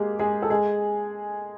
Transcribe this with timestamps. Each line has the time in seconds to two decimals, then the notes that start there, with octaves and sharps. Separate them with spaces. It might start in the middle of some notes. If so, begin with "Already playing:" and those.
Already playing: G#3 A#3 G4 G#4
0.19 G#3 G#4
0.42 A4
0.50 G#3 G#4